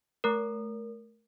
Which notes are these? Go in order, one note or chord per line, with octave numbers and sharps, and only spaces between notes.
A3 A#4